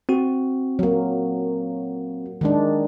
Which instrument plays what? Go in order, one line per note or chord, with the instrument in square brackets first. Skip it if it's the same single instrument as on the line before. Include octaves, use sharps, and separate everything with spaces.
[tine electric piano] C4 F#4
[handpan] F#3 A#3
D#3 G#3 D4